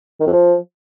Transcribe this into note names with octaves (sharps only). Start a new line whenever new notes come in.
D#3
F2
F3